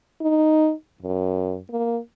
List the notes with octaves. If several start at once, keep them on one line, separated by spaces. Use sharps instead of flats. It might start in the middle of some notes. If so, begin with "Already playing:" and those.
D#4
F#2
A#3